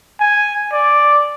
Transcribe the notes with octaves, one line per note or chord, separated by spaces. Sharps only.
G#5
D5